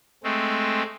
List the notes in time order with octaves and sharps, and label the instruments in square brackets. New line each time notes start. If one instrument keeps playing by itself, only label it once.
[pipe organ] G#3 A3 C4